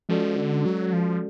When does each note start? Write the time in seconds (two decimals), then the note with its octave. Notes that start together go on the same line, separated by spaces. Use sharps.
0.09 F3 G#3 C#4 F#4 A4 D5
0.37 D3
0.66 F#3
0.93 F3